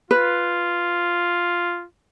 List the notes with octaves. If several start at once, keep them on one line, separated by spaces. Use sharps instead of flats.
F4 B4